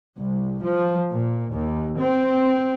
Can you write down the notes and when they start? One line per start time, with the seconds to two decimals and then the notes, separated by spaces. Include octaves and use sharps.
0.19 C2
0.63 F3
1.11 A#2
1.49 D#2
1.98 C4